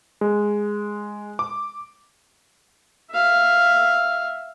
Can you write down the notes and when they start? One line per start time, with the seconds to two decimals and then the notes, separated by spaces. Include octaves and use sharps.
0.21 G#3
1.39 D6
3.11 E5 F5